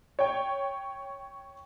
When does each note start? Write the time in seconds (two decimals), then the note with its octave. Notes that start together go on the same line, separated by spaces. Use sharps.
0.19 C#5 G5